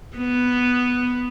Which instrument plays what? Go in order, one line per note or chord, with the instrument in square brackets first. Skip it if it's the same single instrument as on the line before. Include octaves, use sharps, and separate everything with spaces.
[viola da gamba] B3